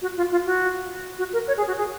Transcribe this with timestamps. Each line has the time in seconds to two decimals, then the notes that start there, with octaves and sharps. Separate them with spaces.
0.02 F#4
0.17 F4
0.31 F4
0.46 F#4
1.18 F#4
1.33 A#4
1.48 C#5
1.57 G#4
1.67 F#4
1.77 G#4